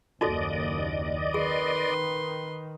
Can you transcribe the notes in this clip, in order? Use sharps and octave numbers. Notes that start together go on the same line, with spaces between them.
F#1 D#2 D#4 F#4 A4 D5 D#5
D#3 G#4 B4 C6